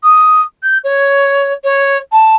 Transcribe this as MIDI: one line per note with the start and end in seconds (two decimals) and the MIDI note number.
0.03 0.42 87
0.63 0.78 91
0.84 1.53 73
1.64 1.98 73
2.12 2.36 81